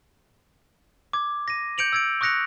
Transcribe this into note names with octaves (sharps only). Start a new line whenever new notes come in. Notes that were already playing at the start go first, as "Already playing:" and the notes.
D6 G#6
A#6 D#7
G6 C#7 D7 F7 F#7
E6 G#6 D7
C#6 D#6 F#6 A#6 C#7 F7